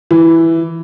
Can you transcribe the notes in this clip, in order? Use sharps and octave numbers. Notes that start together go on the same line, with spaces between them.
E3